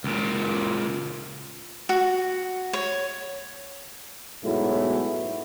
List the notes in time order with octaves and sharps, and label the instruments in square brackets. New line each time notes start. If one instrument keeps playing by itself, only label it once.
[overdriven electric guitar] C#2 A#2
[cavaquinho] F#4
C#5
[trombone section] G#2 B2 F#3 A3 E4